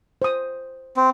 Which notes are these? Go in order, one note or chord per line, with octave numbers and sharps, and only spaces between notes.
C5 D#6
C4